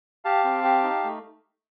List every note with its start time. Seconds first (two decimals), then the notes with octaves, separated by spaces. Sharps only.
0.25 G4 F5 A5
0.44 C4
0.64 G4
0.83 D#4
1.04 A3